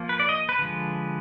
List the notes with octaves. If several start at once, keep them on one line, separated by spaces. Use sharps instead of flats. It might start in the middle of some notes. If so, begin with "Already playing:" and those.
Already playing: F3 A#3
B4
D5
D#5
B4
D3 F3 G#3